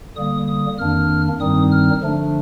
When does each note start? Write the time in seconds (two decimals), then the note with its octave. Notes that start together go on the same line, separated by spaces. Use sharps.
0.16 D3 G3 A#3 D#6
0.48 D#6
0.78 F2 D#3 A#3 D4 F6
1.40 G2 D#3 G3 C4 D#4 D#6
1.72 F6
2.02 D3 F3 A3 D4